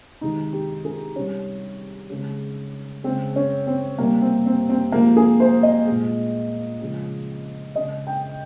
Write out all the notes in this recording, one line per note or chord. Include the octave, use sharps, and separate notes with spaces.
C3 D#3 G#3 D#4
G4
G#4
C3 G3 C#4
C#3 G#3
C#3 G#3 C4
C#4
C4
C3 G3 A#3
C4
C4
C4
C3 F3 G#3 A#3
G#4
C5
D#5
A#2 G#3
C#3 F3 G#3
C#3 G#3 D#5
G5